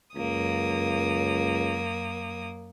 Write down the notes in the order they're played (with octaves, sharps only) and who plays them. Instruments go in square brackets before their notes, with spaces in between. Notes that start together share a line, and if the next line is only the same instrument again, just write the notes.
[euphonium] C#2 [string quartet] F#2 A#3 D#6